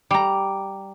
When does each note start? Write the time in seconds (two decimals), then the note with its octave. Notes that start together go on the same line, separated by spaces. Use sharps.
0.11 G3 A#5